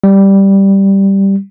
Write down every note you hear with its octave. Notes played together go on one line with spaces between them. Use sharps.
G3